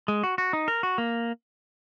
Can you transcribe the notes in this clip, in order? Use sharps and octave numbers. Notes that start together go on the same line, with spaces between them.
G#3
F#4
F#4
D#4
A#4
F#4
A#3